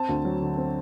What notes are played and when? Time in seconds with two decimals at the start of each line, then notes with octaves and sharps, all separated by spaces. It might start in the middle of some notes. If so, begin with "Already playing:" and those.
Already playing: C4 A5
0.09 D2
0.25 F#3
0.42 D3
0.58 C4